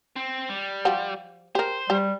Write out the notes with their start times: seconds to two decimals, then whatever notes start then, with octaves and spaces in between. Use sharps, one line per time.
0.16 C4
0.49 G3
0.85 F3 F#4 G4
1.55 G4 A#4 C5
1.90 G3 G4